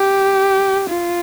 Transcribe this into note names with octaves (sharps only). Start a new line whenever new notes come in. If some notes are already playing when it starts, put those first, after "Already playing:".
Already playing: G4
F4